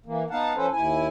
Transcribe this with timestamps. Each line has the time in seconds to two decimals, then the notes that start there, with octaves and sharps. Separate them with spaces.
0.06 E3 A#3
0.30 B3 D#4 F5 F#5 A5
0.56 F3 C#4 A4 B4 C5
0.72 D#2 E4 G#5